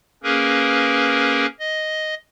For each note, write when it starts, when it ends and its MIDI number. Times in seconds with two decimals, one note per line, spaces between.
0.23 1.46 58
0.23 1.46 61
0.23 1.46 68
0.23 1.46 70
0.23 1.46 71
1.59 2.14 75